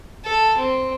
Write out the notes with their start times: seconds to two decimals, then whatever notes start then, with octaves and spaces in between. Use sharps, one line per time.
0.25 A4
0.58 C4